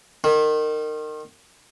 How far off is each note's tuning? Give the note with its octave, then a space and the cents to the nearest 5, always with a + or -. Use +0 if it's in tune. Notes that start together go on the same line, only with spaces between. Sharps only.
D#3 -25